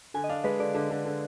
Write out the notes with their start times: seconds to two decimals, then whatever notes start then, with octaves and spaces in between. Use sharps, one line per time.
0.14 D3 G#5
0.24 D#5
0.29 D4 F5
0.44 G#3 B4
0.60 D3 D5
0.75 D3
0.90 D3
1.05 D3